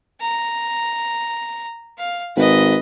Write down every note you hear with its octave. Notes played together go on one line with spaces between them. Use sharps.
A#5
F5
G#1 B4 D#5